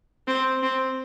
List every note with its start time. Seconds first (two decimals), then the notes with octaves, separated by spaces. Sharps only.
0.28 C4
0.63 C4